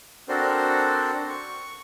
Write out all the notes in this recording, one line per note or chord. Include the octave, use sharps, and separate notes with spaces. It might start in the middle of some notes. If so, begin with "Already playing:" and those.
C4 D4 F#4 A4 A#4 C5
C#6